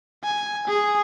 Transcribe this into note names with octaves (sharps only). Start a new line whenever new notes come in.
G#5
G#4